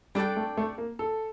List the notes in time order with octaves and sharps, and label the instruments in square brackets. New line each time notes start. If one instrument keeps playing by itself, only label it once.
[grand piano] G3 [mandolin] D4 A4 D5 G5
[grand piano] A3
A3
A#3
A4